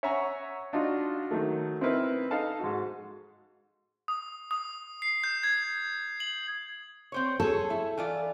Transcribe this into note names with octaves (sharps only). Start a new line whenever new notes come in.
C#5 E5 F#5 G#5 A#5 C#6
D4 D#4 F4 F#4
D#3 F#3 A3
C4 D#4 E4 A#4 B4
D#4 A4 F5 A5
G#2 F#4
D#6
D#6
C7
G6
G#6
F#7
C4 C5 C#5
G#4 A4 C#5
E4
E3 F4 D5